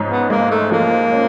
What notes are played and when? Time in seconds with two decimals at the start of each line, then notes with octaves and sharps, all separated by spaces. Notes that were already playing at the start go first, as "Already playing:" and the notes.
Already playing: G#2 F3 C#4
0.10 B3
0.30 G#3 A#3
0.51 A3
0.71 F3 A#3
1.12 C#4